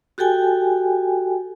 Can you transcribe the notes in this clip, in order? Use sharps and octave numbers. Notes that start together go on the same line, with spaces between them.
F#4 G4 A4 G5 G#5